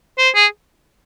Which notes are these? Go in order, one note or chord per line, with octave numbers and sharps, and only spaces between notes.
C5
G#4